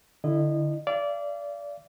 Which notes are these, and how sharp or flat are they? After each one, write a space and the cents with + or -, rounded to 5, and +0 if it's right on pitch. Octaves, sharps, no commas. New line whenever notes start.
D3 +0 E4 +0 D#5 -25
D5 -20 F5 -40